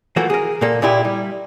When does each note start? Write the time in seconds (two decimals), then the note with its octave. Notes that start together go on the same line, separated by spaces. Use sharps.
0.16 E3 F3 A3 A#3 F#4
0.30 G#4 A#4
0.61 A#2 A#3 A4
0.82 A#2 D#4 E4 G4
1.05 G3